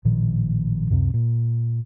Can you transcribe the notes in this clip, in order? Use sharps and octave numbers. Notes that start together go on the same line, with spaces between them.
A1 A#2 D#3 F3
C#2 F#2 C3 C4
A#2